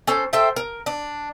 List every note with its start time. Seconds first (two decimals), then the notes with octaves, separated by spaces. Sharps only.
0.07 C#4 A4 C5
0.33 A4 C5 E5 G5
0.56 A#4
0.86 D4